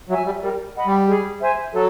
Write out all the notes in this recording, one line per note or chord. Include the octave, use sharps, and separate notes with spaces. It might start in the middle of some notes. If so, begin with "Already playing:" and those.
F#3 E5 G#5
G3
G3 A#4
D#5 F#5 B5
G3
G#4
C5 E5 G#5
F#3 A4